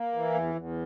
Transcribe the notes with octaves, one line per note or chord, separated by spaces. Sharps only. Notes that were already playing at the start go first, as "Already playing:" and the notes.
Already playing: A#3
E3
E2
E2